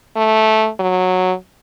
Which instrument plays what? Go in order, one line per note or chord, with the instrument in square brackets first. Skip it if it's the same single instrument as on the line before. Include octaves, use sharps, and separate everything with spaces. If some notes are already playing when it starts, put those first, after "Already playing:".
[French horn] A3
F#3